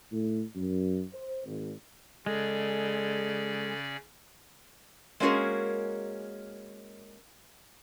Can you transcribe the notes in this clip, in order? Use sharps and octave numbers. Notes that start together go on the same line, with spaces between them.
A2
F#2
C5
G#1
C#3 G#3 C#4 A4 D5
G#3 A#3 C#4 F#4 G#4 A#4